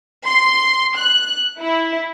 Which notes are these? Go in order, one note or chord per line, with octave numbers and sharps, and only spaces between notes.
C6
F#6
E4